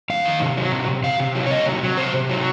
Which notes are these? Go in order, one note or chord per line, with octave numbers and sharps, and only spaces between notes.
F2 F5
D#3
C3
F#3
C3
C3
C3 F5
C3
F#3
C#5
C3 D#5
F#3
F#3
C3 C5
C3
F#3